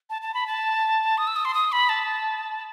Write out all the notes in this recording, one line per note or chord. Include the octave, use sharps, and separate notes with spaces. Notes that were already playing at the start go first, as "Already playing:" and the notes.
A5
A5
B5
A5
D#6
E6
D#6
C6
D#6
B5
A5